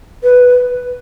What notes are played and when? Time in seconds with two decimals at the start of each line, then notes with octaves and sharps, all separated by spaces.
0.23 B4